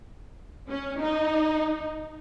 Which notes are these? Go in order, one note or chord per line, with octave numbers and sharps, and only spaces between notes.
C#4
D#4